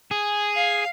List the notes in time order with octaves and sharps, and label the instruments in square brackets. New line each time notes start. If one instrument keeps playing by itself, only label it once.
[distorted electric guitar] G#4
[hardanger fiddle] F5